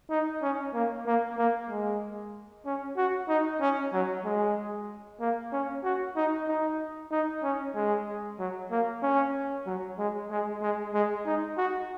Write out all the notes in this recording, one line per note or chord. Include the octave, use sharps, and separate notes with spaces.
D#4
C#4
A#3
A#3
A#3
G#3
C#4
F#4
D#4
C#4
F#3
G#3
A#3
C#4
F#4
D#4
D#4
D#4
C#4
G#3
F#3
A#3
C#4
F#3
G#3
G#3
G#3
G#3
D#4
F#4